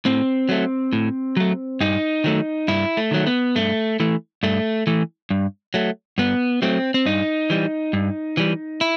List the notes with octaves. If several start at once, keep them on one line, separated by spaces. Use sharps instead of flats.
A2 C4
F#3 A3
A2
F#3 A3
G2 D#4
D#3 F#3 A3
G2 E4
A3
D#3 F#3 A3
B3
G2 A3
E3 A3
G2 A3
E3 A3
G2
F#3 A3
G2 B3
F#3 A3 C4
C4
G2 D#4
E3 G3
G2
E3 G3
E4